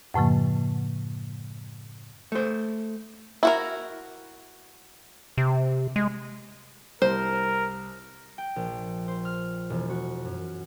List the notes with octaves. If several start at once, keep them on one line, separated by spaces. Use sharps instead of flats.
F#2 A2 C#3 F3 A#3
A3 C5
E4 F#4 A#4
C3
G#3
C2 A#4 C5
G5
A#1
C5
F6
E1
F#4
F#2